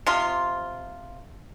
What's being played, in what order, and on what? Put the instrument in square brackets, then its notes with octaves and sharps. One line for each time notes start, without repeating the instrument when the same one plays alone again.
[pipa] C3 F3 F4